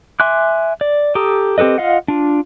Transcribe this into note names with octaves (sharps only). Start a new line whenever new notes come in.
E5 G#5 C6 D6 F#6
D5
G4 A4 A#5 D#6
C4 G4 A4 B4 D#5
F4 D#5 F5 F#5
D4 F4